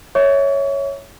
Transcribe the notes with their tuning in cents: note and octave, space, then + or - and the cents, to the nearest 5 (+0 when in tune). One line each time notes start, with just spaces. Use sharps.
C#5 +0 E5 -15 C#6 +35